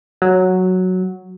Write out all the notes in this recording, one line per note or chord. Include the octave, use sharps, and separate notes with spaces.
F#3